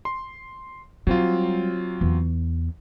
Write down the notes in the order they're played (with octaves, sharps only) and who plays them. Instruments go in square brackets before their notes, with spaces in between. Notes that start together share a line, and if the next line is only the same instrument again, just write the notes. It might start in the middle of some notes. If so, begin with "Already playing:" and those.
[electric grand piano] C6
[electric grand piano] F#3 C4 F4 [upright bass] G3
[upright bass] E2